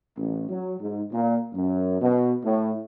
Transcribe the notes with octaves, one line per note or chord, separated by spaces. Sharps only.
A1
F#3
G#2
A#2
F#2
B2
A2